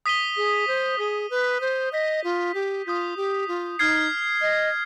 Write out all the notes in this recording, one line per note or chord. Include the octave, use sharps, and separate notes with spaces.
D#6 B6 D#7 G7
G#4
C5
G#4 D#6 B6 D#7 G7
B4
C5
D#5 D#6 G6 B6
F4
G4
F4 D#6 G6 B6
G4
F4
D#4 F6 G#6 C7
D#5